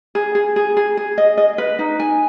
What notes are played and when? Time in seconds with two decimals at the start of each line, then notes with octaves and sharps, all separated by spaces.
0.15 G#4
0.35 G#4
0.56 G#4
0.77 G#4
0.97 G#4
1.18 D#5
1.37 D#5
1.58 B4
1.79 D#4
2.00 G#5